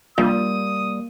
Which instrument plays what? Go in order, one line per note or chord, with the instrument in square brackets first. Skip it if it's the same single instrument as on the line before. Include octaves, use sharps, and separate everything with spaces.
[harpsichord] A#1 [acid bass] G3 [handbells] A#3 [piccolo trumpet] D#6